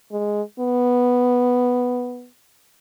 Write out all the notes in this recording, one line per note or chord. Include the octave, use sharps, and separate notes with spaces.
G#3
B3